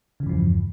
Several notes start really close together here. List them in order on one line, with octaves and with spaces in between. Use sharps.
C#3 E3 G2 F3 E2